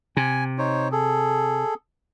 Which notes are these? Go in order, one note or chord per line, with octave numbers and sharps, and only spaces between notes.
C3 G#5
D#4 C5 C#5
G#4 A4